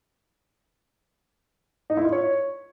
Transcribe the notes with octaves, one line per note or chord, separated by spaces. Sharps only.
D#4
E4
F4
C#5